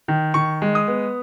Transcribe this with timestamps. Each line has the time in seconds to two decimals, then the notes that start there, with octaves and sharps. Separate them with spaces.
0.08 D#3
0.34 D#3 C#6
0.62 G#3
0.75 D#6
0.88 B3